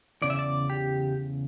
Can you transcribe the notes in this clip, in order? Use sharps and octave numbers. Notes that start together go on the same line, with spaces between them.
E2 C#3 D5
E5
D5
G4